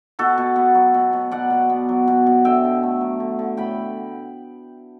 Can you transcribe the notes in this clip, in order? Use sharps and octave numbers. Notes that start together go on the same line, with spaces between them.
B2 F#4 A4
B2
B3
F#3
B2
B2
B2 D5 F#5
B2
B3
F#3
B2
B2
D3 E5 G5
D3
A3
F#3
D3
D3
A2 G5 B5